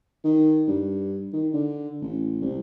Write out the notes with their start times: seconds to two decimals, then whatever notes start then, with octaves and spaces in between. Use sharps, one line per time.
0.24 D#3
0.68 G2
1.33 D#3
1.54 D3
2.02 A1
2.42 C2